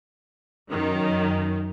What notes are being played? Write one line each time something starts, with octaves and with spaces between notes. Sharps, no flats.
F#2 D#3